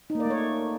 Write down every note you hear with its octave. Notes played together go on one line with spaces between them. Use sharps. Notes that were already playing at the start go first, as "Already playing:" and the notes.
D#4
A#3
D5
A3
C#5